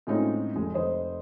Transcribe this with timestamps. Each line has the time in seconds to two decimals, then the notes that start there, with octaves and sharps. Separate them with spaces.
0.07 A2 G#3 C4 C#4 D#4 F4
0.56 F1 G#3
0.74 F1 C5 D#5